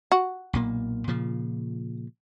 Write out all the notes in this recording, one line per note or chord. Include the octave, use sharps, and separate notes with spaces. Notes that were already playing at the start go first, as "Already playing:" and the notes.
F#4
B1 A#2 A#3
A#2 C#3 F3